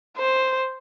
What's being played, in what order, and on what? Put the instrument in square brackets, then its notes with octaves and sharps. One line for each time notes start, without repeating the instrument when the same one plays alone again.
[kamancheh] C5